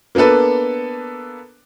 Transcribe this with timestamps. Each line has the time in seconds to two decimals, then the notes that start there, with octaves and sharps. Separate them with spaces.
0.15 A#3 B3 D4 A4 B4